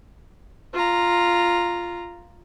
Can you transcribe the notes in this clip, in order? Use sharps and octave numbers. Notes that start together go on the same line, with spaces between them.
F4 A#5